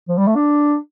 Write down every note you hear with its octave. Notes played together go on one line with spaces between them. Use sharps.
F3
G3
A3
D4